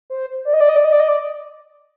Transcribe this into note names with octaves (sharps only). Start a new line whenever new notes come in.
C5
D5
D#5
D5
D#5
D5
D#5
D5
D#5
D5